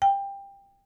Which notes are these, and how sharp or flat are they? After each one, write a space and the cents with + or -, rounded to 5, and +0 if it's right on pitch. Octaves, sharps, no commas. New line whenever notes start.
G5 +20